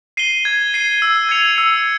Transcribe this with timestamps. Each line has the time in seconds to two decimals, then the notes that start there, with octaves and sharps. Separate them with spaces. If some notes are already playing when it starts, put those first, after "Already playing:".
0.17 C7 D#7 G7
0.45 G#6
0.74 C7 D#7 G7
1.02 E6
1.29 G#6 C#7 F7
1.58 E6